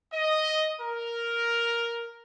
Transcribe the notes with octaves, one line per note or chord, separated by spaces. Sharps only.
D#5
A#4